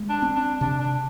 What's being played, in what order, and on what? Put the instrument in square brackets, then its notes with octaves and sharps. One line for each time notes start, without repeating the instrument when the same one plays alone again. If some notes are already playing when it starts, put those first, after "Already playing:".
Already playing: [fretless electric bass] G#3
[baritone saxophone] D4
[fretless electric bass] C4
[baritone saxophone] D4
[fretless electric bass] C3 [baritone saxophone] D4
[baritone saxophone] D4